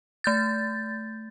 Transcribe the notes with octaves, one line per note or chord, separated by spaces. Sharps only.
A3 G6 A6